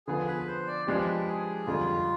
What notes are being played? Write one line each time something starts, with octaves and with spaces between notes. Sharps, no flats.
D3 F3 B3 F4 G#4
B4
C5
D5
F3 G#3 D4 G4 B4
G#4
F2 D3 G3 F4